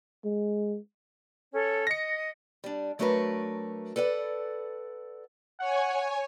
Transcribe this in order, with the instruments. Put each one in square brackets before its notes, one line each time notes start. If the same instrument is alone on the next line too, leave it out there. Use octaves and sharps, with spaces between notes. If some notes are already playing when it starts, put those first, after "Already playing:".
[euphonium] G#3
[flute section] C#4 A4 C#5
[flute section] D#5 [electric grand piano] A#6 C#7
[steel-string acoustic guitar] G3 D4
F#3 A3 D4 F#4 A#4 B4
A4 B4 D5 F#5
[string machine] C#5 G#5 [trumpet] F#5